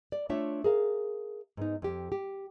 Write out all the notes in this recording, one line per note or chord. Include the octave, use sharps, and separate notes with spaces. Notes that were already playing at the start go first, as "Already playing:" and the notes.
D5
A3 D4 F4 C#5 E5
G#4 A#4 F5
G#2 B3 D#4
F2 G4
G4